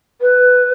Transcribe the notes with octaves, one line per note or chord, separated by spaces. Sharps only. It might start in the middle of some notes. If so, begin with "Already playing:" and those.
B4